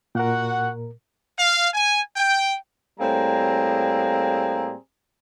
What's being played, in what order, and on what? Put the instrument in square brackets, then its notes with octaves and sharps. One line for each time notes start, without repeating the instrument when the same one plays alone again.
[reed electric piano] A#2 A#4 [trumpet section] F#4 F#5
[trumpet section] F5
G#5
G5
[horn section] A2 G3 A#3 C4 G#4 A#5